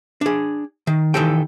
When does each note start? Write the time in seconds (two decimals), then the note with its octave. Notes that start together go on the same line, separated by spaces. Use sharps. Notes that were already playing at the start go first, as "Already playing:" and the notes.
0.21 D4 G#4
0.87 D#3
1.14 D#3 E3 G4 A4 G5